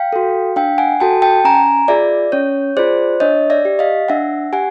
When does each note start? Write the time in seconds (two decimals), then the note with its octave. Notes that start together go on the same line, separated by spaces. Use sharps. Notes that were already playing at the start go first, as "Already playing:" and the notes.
Already playing: F5 G5
0.13 F#4 A4
0.56 D4 F5 G5
0.78 F#5 G#5
1.00 F#4 A4 G5 A5
1.22 G5 A5
1.44 C#4 G#5 A#5
1.88 F4 G#4 D5 E5
2.32 C#4 C#5
2.77 F4 G#4 C5 D5
3.20 D4 C#5 D#5
3.50 D5 E5
3.65 G4
3.79 D#5 F5
4.08 D4 E5 F#5
4.53 G4 F#5 G#5